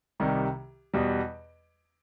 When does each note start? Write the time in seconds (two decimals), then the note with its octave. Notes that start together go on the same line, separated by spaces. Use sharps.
0.20 C2 C3 D#3 G3
0.94 E2 B2 G3